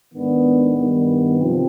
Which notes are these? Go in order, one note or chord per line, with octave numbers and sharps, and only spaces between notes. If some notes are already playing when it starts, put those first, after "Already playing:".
G#2 D#3 B3 D4
G2 D#3 B3
C3 F3 C4